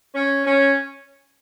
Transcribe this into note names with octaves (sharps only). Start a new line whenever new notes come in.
C#4
C#4